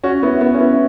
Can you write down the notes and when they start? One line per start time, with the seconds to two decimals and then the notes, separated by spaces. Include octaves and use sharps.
0.04 C#4 F#4
0.23 B3 E4
0.41 B3 E4
0.54 C#4
0.59 B3 E4